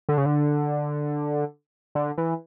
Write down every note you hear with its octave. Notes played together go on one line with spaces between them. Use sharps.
D3
C#3
D3
D3
E3